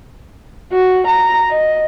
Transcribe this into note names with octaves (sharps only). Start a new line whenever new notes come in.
F#4
A#5
D#5